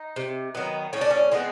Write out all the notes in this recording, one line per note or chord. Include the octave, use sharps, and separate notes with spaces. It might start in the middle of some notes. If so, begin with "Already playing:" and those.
Already playing: D#4
C3
D#3 F#3 B3
A2 C#4
D4
C#4
F3 G#3 B3 C4